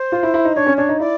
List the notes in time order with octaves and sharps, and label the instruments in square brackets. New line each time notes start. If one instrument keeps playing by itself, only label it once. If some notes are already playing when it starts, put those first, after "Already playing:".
Already playing: [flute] C5
[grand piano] F4
E4
E4
D#4
[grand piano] D4 [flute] C#5
[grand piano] C#4
[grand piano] D4 [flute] C#5
[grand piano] D#4
[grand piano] E4 [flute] D5